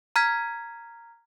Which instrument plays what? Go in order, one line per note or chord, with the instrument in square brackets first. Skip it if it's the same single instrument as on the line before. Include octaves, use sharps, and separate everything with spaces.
[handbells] A#5 F6 G#6 B6